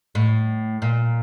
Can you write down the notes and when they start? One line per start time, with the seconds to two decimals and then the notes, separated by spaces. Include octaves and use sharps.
0.15 A2
0.82 A#2